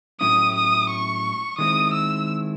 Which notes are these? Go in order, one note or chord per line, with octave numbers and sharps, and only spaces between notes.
A2 F#3 C#4 E4 D#6
D#6
C#6
D#3 G#3 C4 E4 D#6
E6